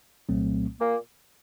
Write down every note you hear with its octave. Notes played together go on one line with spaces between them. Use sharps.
C2 A#2 F#3 A3 C4
A#2 A#3